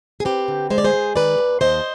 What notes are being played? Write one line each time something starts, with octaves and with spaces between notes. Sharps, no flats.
G#4
C4 G4 B4
D3
G#3 C5
D5
G#4 C5
G#3
D#3 B4 D5
D#2
D#2 C5 D#5